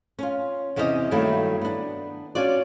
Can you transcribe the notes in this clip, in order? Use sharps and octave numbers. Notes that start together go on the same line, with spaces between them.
C#4 F4
E2 C3 C#4 G4 G#4 D#5
G2 D#3 F#3 A3 A#3 E4
B3 D4
C#4 F4 F#4 D5